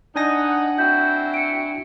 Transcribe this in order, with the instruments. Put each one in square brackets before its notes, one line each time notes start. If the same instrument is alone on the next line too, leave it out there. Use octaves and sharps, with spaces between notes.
[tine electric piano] D4 G#5 A#6 [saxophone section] D#4 [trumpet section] F#5
[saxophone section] C4 E4 F#4 [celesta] G6
[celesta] C#7 D7